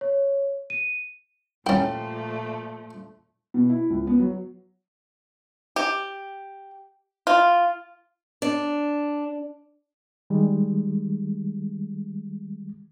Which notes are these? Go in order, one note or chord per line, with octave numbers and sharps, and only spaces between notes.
C#5
D#7
A#2 F3 G3 A3 C#4 E4 G5
B2
E4
C#2
B3
F#3
G4
F4
D4
D#3 G3 G#3